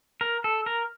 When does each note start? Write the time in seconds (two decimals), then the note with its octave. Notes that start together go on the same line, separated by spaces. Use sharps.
0.21 A#4
0.44 A4
0.66 A#4